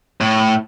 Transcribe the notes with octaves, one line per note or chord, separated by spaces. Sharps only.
A2